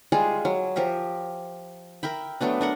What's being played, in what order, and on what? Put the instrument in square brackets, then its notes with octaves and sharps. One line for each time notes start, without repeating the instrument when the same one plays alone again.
[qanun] G3 G#3 F4 G#4
F#3
F3 G4 A#4 E5
A#4 E5 G5 B5
F#3 A3 B3 D4
D4 A#4 F#5